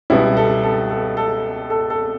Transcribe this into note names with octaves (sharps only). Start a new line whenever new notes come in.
C#2 B2 G3 B3 E4
A4
A4
A4
A4
A4
A4